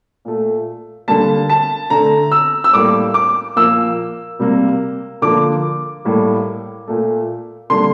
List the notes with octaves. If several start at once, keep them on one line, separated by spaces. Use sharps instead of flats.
A#2 A3
D3 G3 A#3 A5
A5
D3 A3 A#5
E6
E6
A2 G3 A#3 D6
D6
A#2 F3 A#3 E6
C3 G3 A#3
D3 F3 A#3 D6
A2 G3 A#3
A#2 A3
D3 G3 A#3 C6